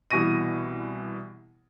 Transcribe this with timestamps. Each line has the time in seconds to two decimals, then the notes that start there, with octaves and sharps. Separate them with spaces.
0.10 C2 B2 E3 C#6 A#6 D#7